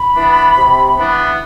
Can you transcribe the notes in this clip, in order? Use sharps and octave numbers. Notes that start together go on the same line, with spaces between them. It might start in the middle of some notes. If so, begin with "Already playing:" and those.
Already playing: B5
E3 B3 D4
C3
E3 B3 D4